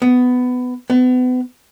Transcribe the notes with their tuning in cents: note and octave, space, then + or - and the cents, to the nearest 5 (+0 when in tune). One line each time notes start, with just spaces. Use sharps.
B3 +15
B3 +35